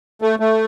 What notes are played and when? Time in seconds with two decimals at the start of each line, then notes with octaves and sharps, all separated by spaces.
0.22 A3
0.39 A3